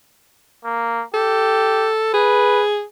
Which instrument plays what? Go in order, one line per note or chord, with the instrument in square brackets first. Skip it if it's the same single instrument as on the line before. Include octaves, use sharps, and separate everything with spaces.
[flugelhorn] A#3
[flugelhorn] G4 [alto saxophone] A4
[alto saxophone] G#4 [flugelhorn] B4